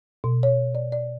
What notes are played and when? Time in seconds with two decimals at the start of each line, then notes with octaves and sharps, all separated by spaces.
0.24 B2
0.43 C#5
0.75 D5
0.92 D5